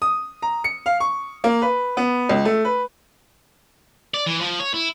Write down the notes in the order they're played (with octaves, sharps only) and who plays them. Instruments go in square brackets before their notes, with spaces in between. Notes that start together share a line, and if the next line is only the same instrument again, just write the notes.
[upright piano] D#6
A#5
C#7
F5
C#6
A#3
B4
B3
C#2
A3
B4
[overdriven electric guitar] D5
E3
F3
C#5
E4